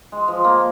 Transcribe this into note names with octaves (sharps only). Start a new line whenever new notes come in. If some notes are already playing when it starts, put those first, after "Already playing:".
G#3
F3
A#3